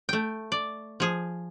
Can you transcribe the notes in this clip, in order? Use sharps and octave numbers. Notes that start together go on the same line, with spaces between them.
A3 G5
D5
F3 G#4